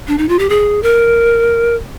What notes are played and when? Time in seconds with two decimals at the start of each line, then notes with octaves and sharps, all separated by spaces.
0.08 D4
0.18 D#4
0.29 F4
0.39 G4
0.49 G#4
0.83 A#4